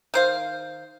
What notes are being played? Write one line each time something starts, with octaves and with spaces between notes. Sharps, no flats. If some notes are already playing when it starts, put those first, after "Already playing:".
D#3 C5 F5